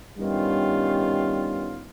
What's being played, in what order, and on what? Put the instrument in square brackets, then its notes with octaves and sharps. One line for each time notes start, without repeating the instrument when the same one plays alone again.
[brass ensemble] G2 D#3 G3 B3 C#4 F4